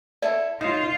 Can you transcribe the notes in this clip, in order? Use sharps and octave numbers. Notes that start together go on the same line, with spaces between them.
E4 A4 D5
D#4 F4 C5 C#5 F5